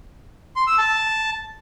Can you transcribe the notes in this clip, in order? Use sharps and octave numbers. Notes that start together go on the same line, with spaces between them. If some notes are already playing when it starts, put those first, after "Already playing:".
C6
E6
A5